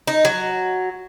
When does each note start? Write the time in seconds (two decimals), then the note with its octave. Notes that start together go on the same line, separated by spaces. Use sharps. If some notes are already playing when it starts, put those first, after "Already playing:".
0.07 D#4
0.25 F#3